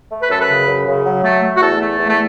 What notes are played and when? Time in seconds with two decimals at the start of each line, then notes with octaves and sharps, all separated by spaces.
0.10 A3
0.21 B4
0.29 F#2 A4
0.39 B4
0.48 C#3
0.68 F#2
0.86 C#3
1.05 F#3
1.24 A3
1.42 A3
1.55 F#4
1.61 E2 A4
1.80 A3
1.99 E2
2.07 A3